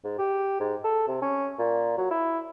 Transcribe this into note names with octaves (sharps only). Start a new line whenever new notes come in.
G#2
G4
G#2
A4
C3
C#4
A#2
F#3
E4